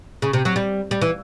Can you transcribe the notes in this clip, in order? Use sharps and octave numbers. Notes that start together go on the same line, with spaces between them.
C#3
C3
F#3
G3
G3
E3